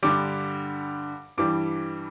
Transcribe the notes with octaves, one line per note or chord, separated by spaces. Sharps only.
G2 D3 G3 D6
G2 E3 G3 D6